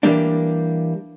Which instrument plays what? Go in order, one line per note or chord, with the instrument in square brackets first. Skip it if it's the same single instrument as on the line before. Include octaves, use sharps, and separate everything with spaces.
[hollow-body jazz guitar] E3 G3 A#3 D4